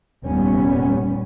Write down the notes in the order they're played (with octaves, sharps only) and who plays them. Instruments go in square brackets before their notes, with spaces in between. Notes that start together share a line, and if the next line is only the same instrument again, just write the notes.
[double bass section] F1 D#2 A#2 G3 B3 C#4